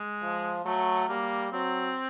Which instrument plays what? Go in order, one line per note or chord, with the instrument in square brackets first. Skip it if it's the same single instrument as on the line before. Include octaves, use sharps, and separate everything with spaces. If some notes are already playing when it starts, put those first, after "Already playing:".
Already playing: [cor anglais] G#3
[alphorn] F3
[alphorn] F#3 [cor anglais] A3
[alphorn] G3 [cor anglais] A#3
[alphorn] F#3 [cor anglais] C4